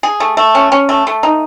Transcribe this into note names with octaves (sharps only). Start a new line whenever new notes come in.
G#4
A3
A3
C#4
C#4
A3
A3
D#4